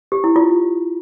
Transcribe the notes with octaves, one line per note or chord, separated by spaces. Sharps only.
G4
E4
F4